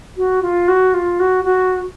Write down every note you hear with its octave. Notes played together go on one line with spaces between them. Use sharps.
F#4
F4
F#4
F4
F#4
F#4